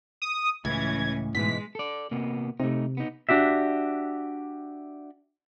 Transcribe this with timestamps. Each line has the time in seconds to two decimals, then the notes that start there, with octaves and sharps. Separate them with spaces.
0.22 D#6
0.65 C#2 A2 E3 C#4 G#6
1.35 G#2 B2 E3 G#3 B6
1.75 A4 D5
2.11 C3 A#3 B3
2.60 C3 A3 D#4
2.97 B3 D#4
3.29 D4 F#4 G4 E5